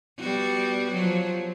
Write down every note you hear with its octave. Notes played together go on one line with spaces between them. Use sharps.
G3 B3 F#4
F3 F#3